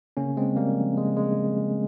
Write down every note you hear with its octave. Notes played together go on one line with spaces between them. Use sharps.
C#3 A#3 C#4
G#3 C4
C#3
G3 A#3
F3
C#3 G#3
G#3